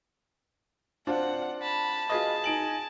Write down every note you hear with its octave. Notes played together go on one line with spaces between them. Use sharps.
C4 D4 F4 F#5
A5 B5
F4 G#4 B4 D#5
D#4 G#5 D7 F#7